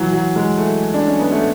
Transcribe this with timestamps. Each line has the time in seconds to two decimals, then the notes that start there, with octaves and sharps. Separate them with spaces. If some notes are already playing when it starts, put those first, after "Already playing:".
Already playing: E3 F#3
0.13 F#3
0.36 G#3
0.57 A3
0.94 D4
1.06 C#4
1.19 B3
1.32 A3